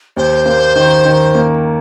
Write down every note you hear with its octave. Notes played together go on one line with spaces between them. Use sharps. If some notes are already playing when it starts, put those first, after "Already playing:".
D#2 C5
A#3
D#3
D#3
A#3